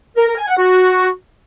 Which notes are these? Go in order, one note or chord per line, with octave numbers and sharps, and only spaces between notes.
A#4
A#4
G#5
F#5
F#4